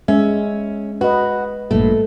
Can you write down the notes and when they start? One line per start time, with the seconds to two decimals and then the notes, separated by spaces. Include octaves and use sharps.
0.08 G#3 C#4 E5
1.01 F#4 B4 D#5
1.71 A1 G2 A#2 A3